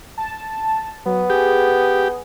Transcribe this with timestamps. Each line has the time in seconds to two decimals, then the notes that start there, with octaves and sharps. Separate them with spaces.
0.18 A5
1.06 F#3 B3
1.30 G4 G#4